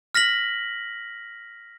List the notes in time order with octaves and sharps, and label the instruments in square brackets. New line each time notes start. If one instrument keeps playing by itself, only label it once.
[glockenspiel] F6 A#6 B6 F#7